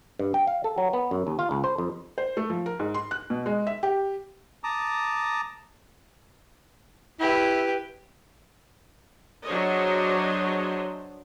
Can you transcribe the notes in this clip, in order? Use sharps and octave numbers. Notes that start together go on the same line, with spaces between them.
G2
G5
F5
A4
F#3
B3
F#2
D#2
F4
C#2
C5
F2
C5
A3
F3
A#4
G#2
C6
F#6
B2
G#3
E5
G4
A5 A#5 D6 D#6
E4 G4 B4
F#3 D4 G#4 C5 C#5 D#5